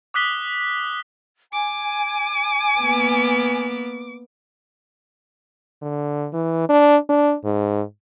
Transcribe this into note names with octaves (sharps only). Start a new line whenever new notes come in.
D6 D#6 F#6 B6 G7
G#5 D6
A#3 B3
D3
E3
D4
D4
G#2